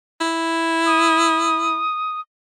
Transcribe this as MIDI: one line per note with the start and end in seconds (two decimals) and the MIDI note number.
0.21 1.83 64
0.86 2.20 87